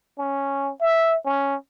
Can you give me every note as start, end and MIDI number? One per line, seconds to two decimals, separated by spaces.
0.18 0.72 61
0.81 1.17 76
1.25 1.56 61